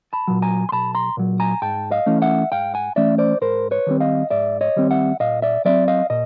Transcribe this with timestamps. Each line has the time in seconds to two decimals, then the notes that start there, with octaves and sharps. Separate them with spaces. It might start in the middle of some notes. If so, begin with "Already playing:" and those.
0.13 A5 B5
0.28 A#2 F#3
0.42 G#5 A#5
0.69 C6
0.72 B1 A5 B5
0.95 A#5 C6
1.17 A#2 F#3
1.40 G#5 A#5
1.62 G#2 G5 A5
1.91 D#5 F5
2.06 E3 A3 C#4
2.22 E5 F#5
2.52 G#2 F5 G5
2.74 F#5 G#5
2.96 E3 A3 C#4 D5 E5
3.18 C5 D5
3.41 G#2 A#4 C5
3.71 B4 C#5
3.87 D#3 G3 C4
4.01 D#5 F5
4.30 G#2 D5 E5
4.61 C#5 D#5
4.76 D#3 G3 C4
4.91 E5 F#5
5.20 A#2 D#5 F5
5.42 D5 E5
5.65 F#3 A3 C4 D5 E5
5.88 D#5 F5
6.10 A#2 D#5